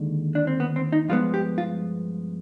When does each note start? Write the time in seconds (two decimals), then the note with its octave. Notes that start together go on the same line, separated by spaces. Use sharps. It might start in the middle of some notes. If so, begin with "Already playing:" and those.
Already playing: D#2 D3 G#3
0.35 D4
0.47 C4
0.60 B3
0.76 C4
0.92 D#4
1.08 G2 F3 G#3 B3 F4
1.34 G4
1.58 F4